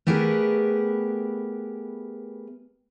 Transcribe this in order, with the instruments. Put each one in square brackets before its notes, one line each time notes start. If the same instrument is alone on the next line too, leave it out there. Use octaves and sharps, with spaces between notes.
[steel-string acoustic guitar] A3 B3 G4 G#4 A#4 B4